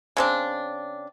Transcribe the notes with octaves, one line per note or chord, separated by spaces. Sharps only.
C#3 C4 D4